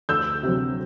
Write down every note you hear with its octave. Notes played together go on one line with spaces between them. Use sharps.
D2 E6 G6
C3 F#3